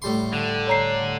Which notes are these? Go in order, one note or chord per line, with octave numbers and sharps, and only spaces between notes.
A2 G3 C6
D3
C#5 A#5 C7